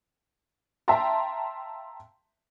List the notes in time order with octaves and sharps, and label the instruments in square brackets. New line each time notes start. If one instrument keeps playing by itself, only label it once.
[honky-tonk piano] E5 F5 G5 A5 A#5 C6